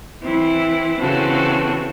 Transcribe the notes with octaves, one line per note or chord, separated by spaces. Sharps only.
E3 C4 E4
C#3 E3 C4 F#4 A4